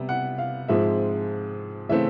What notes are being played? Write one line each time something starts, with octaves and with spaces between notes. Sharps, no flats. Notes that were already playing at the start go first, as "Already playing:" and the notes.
Already playing: C3 G3 B3
F#5
F5
G#2 F3 G#3 C4 E5
C#3 E3 A3 C4 E5